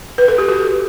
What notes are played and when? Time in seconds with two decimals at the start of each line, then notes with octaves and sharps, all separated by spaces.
0.18 B4
0.28 A4
0.38 G4
0.48 F#4 A4